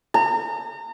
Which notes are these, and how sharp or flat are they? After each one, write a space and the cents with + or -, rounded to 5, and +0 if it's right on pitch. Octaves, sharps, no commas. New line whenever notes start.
A#5 -40